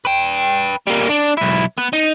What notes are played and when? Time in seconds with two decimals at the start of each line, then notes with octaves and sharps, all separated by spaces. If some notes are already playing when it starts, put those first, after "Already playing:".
0.05 B4 G5
0.87 G3 A#3
1.09 D4
1.38 B1 E4
1.78 B3
1.93 D#4